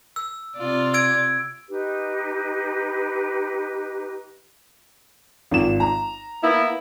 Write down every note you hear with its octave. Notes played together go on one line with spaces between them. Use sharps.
E6
C3 F4 D5
E6 G#6 D7
D#4 G4 B4
G#1 F4 E7
A#5
A#3 B3 E4